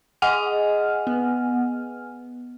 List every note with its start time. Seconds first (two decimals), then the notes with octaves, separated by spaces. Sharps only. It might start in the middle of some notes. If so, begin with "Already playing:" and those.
0.22 G#4 D#5 F#5 G#5 F6
1.07 B3